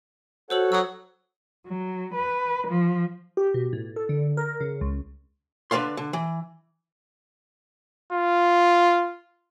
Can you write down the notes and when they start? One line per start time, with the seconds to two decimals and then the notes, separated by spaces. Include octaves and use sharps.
0.50 F#4 A4 C5 C#5 F#5 E6 F#7
0.72 F#3 D#6 E6
1.69 F#3
2.16 B4
2.70 F3
3.37 G4
3.54 B2
3.73 A2
3.96 A4
4.09 D3
4.37 A#4
4.61 C#3
4.81 C#2
5.71 D3 B4 D5 F5 C6
5.97 D3
6.13 E3
8.12 F4